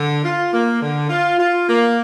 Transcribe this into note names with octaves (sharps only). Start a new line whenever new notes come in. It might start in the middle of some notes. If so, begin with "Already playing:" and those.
Already playing: D3
F4
A#3
D3
F4
F4
A#3